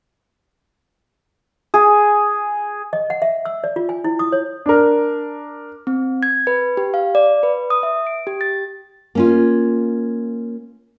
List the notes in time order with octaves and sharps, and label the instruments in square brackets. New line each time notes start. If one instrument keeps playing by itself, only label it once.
[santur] G#4
[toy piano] D#5
F#5
E5
E6
D5
F4
G#5
E4
D#6
C#5
[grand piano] D4 A#4
[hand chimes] C4
G#6
B4
G4
F5
D5
B4
D#6
E5
D7
G4
A6
[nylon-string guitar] A#3 C#4 F4